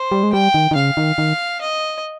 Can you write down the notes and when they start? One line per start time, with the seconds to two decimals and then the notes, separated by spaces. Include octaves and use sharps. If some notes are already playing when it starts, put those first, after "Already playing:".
Already playing: C5
0.12 G3
0.23 G#3
0.33 G3 G5
0.54 D#3
0.71 D#3
0.75 C#3 F5
0.97 D#3
1.18 D#3
1.61 D#5